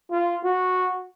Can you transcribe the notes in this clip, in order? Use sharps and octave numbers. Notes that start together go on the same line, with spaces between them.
F4
F#4